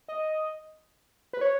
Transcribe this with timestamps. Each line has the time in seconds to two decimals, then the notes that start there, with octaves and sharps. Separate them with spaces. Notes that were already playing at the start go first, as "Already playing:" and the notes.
0.08 D#5
1.33 B4
1.41 C#5